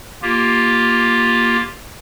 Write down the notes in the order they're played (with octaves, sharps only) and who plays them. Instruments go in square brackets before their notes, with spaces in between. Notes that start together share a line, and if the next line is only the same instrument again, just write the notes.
[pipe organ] A#3 F4 G4